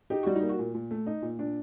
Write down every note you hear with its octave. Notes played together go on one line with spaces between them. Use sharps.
D#4 G4
G3 F#4
D#4
A#3
F#4
A#2
A#2
A3
D#4
A#2
A#2 D4